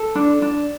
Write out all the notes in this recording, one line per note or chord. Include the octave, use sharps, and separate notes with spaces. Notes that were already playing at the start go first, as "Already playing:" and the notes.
Already playing: A4
D4
D4